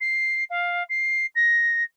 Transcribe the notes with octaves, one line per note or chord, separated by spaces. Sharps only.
C7
F5
C7
A#6